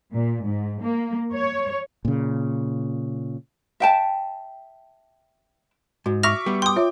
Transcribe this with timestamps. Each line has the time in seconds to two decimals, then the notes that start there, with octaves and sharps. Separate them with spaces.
0.13 A#2
0.45 G#2
0.82 A#3
1.33 C#5
2.05 A#2 C#3
3.80 E5 G5 A5
6.06 G#2 F#4
6.23 E5 C#6 D6 F6 A#6 F7
6.46 G3 B3
6.62 G5 C6 D6 D#6
6.76 F4 C#5 E5